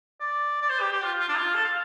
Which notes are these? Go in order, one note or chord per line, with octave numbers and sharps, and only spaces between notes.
D5
D5
C5
G4
G4
F4
F4
D4
F4
A4
F5